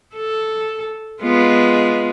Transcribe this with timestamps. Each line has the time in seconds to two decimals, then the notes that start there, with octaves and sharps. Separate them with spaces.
0.16 A4
1.22 G#3 B3 F4